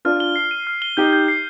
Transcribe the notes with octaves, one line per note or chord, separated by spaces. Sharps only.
D4 F4 F6
G7
C7
D#7
F6
G7
D#4 G4 G6
G6
C7